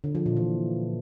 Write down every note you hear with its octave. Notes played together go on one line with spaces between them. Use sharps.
D3
F3
A#2
E3